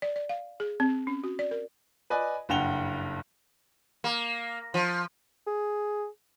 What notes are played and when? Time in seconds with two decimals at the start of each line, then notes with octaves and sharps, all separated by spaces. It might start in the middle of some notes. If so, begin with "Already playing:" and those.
0.02 D5
0.16 D5
0.29 F5
0.60 G#4
0.80 C4
1.07 C#4
1.24 F#4
1.39 D5
1.51 A#4
2.10 B4 D5 D#5 G#5
2.49 F#1 G2 F#5 G5 F7 G7
4.04 A#3
4.74 F3
5.47 G#4